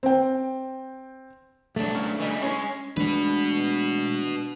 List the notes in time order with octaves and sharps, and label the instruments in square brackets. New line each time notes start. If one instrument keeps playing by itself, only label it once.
[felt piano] C4 G5
[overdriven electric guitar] C2 F#3 [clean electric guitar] A3 D4
[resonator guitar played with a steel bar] C#3
[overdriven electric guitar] E3 G3 [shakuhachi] D#5
[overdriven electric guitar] G#3 [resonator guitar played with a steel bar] C#4 [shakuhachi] C#5
[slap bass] E3 G#3 A3 [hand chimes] D4 [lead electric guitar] F#4 B4